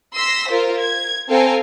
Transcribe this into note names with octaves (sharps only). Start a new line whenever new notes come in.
C6 E6 A#6 B6
F4 A#4 C5
G#6
C4 A4 F5 G5 G#5 A#5